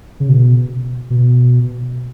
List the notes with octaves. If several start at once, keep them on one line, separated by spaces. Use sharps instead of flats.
C#3
B2
B2